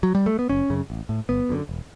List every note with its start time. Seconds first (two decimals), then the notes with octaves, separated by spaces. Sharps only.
0.03 F#3
0.15 G3
0.26 A3
0.39 B3
0.49 F#1 C#4
0.70 F#2 C#3
0.90 A1
1.09 A2
1.29 G1 B3
1.49 F#2 D3
1.69 E1